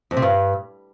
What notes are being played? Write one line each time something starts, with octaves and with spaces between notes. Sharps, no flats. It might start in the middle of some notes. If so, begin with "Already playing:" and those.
F2
C3
G2